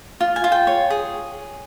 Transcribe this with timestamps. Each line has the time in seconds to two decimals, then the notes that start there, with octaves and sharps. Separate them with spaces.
0.21 F4
0.36 G#5
0.44 F4
0.52 G5
0.67 C#5
0.90 G#4